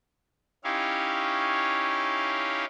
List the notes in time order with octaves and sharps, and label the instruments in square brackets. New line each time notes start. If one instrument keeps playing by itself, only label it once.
[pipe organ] C#4 D#4 E4 G4 C#5 F5